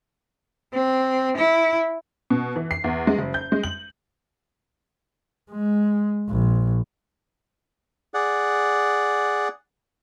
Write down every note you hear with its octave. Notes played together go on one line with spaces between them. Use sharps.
C4
E4
B2
E3
C7
E2
G#3
F#1
G6
G#3
F#7
G#3
A#1
G#4 D5 F#5